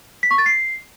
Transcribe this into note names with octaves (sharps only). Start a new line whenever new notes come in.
B6
C#6
A6
C7